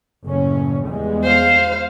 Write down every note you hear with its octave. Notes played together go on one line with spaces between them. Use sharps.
F#1 A2 C#4
E2 G3 G#3
C5 F5